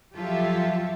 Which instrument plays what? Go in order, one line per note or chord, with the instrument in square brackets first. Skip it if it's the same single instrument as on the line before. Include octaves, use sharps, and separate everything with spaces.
[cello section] F3 F#3 F4 G4 A4 E5